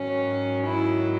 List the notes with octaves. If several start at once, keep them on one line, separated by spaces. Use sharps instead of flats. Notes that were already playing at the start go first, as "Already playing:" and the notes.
Already playing: G#2 D#3 F#3 C#4
E4